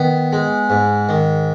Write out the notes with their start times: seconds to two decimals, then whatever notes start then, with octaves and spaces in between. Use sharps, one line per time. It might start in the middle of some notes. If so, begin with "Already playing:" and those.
Already playing: D#3 B3
0.32 G#3
0.70 G#2
1.09 D#3